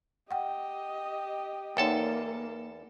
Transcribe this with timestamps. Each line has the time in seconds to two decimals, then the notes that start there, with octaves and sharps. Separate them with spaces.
0.31 G4 D#5 F#5 G5
1.77 E2 A#3 D#4 A4 C#5 G5 A5